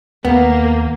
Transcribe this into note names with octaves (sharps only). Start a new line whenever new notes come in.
D#2 A#3 B3